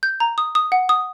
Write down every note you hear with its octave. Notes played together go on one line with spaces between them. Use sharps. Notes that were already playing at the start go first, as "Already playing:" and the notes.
G6
A#5
D#6
D#6
F#5
D#6